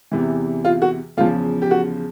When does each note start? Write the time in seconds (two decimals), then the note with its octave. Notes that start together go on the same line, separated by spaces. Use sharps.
0.12 E2 C3 E3
0.65 F4
0.82 F#4
1.17 E2 C#3 F3 F4
1.62 G4
1.71 F#4